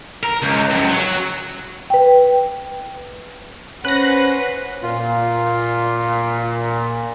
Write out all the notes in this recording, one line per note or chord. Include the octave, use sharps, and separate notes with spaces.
A#4
C#2
C#2 F#2
F#3
B4 G5
C#4 B4 C5 F#5 F#6 A#6
A#2 F4